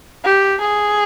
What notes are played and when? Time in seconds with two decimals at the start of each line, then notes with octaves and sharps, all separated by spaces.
0.25 G4
0.61 G#4